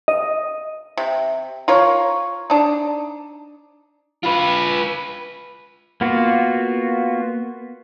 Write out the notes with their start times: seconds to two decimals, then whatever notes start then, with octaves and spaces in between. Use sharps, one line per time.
0.08 D#5
0.97 C3
1.68 F4 A#4 C#5
2.50 D4 D#4
4.24 F4 B4
6.01 A#3 B3 F4 F#4